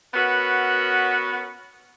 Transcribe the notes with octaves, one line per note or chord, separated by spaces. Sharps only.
B3 C#4 F#4 A#4 B4